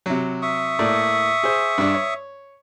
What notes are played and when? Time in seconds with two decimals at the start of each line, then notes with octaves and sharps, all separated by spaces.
0.06 C3 F#3
0.42 E5 C#6 D#6
0.79 A2 A#3 D5
1.44 G#4 C5
1.78 G2 D4
1.94 C#5